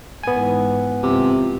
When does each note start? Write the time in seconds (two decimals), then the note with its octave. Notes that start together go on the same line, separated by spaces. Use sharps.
0.23 G#2 E3 B3 G#5
1.03 C#2 A2 C3 F3